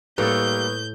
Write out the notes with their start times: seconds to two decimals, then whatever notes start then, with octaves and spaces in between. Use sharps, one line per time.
0.18 A2 G3 A#3 A4 B4 C#6 D#6 G6